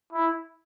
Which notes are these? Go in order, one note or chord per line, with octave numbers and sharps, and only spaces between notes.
E4